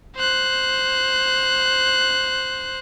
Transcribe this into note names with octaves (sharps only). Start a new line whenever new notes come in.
C5 F#6